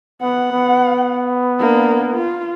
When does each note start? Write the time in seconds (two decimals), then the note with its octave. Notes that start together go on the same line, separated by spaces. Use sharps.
0.22 B3 F#5
0.52 B3
1.60 A#3 D4
2.14 F4